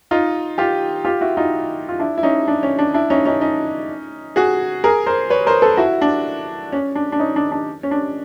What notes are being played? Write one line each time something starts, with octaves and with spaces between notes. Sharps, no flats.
D#4 F4
F4 G4
F4 G4
E4 F#4
D#4 F4
F4
D4 E4
E4
C#4 D#4
D4
C#4
D4
D4 E4
C#4 D#4
C#4 D#4
C#4 D#4
F#4 G#4
G#4 A#4
A#4 C5
B4 C#5
A#4 C5
A4 B4
E4 F#4
D4
C#4
D4
D4
C#4 D#4
D4
D4
C#4
D4